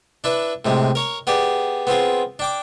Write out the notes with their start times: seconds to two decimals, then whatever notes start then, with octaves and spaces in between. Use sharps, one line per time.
0.24 D4 E4 B4
0.65 A2 C3 G#3
0.95 A#4 C#5 A#5
1.27 B3 G4 G#4 D5
1.87 B3 C4 F4 G#4
2.39 D4 G5 D6